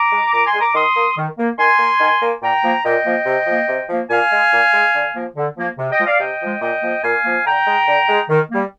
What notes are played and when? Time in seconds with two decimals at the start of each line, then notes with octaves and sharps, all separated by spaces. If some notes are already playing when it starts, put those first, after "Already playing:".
Already playing: A#5 D6
0.12 G#3
0.33 A#2 A#5 D6
0.46 G#5 C6
0.54 G#3
0.61 A#5 D6
0.75 D#3 C6 D#6
0.96 A#3
1.17 D#3
1.38 A#3
1.58 D#3 G#5 C6
1.79 A#3
2.00 D#3
2.22 A#3
2.42 A#2 G5 A#5
2.63 F3 A#3
2.85 A#2 D#5 G5
3.06 F3 A#3
3.26 C3
3.47 F3 A#3
3.69 C3
3.89 F3 A#3
4.10 A#2 F5 G#5
4.32 G#3
4.52 A#2
4.74 G#3
4.95 D3
5.15 F3 A#3
5.37 D3
5.57 F3 A#3
5.78 C3
5.92 D#5 G5
5.99 F3 G#3
6.06 D5 F5
6.20 C3 D#5 G5
6.42 F3 G#3
6.61 A#2 D#5 G5
6.83 F3 A#3
7.04 A#2 F5 G#5
7.25 F3 A#3
7.46 D3 G5 A#5
7.67 G#3
7.88 D3
8.09 G#3
8.29 D#3
8.51 G3 A#3